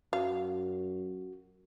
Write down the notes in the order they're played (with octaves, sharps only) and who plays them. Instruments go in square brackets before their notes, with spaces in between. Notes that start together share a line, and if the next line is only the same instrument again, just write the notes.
[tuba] F#2 [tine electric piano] F#4 [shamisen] F5